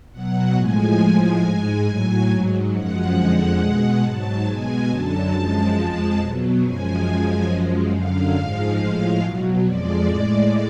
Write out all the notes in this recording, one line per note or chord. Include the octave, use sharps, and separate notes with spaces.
B2 F#3 F#5
A2 F3 G#3 G#5
A2 F3 G#3 G#5
G#2 G#3 G#5
A2 F#3
G#2 F#3
F#2 F3 G#3 F#5
F2 D3 F3 G#3 F#5
B2 G#3
G#2 F#3 A5
B2 G#3 G#5
F#2 D3 F#3 A5
F#2 F3 G#3
F2 F3 G#3
B2 F#3
F#2 F3 G#3 G#5
F#2 F3 G#3
F#2 F3 G#3
F#2 D3 F#3 F5
G#2 F3 G#3
A2 F3 G#3
B2 F#3
F2 F3 G#3 D5
A2 G#3